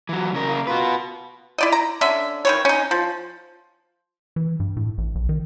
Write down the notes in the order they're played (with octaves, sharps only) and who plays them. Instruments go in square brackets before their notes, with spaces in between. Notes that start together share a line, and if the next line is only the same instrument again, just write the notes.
[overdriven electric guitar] E3 F#3
C#3 A#4
[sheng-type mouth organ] A#3
[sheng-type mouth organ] F4 [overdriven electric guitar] F#4 B4
[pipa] E4 D5 D#5
A#5
D3 C#4 E5
D#3 E3 C#5
C#4 D#4
F3
[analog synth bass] E3
G2
A2
A1
A#1
D#3